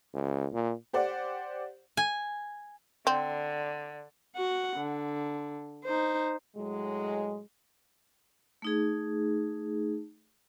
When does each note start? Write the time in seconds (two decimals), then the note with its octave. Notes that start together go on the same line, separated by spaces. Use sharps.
0.14 C#2
0.53 A#2
0.93 G4 C5 D5 F#5
1.97 G#5
3.07 D3 C4
4.36 F#4 F#5
4.77 D3
5.85 D#4 C5
6.56 A2 F#3 G#3
8.62 A3 D#4 G#4